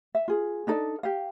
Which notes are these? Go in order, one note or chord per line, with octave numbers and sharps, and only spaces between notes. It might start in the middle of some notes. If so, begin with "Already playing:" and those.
E5
F4 G#4
D4 D#4 A4 D5
G4 F5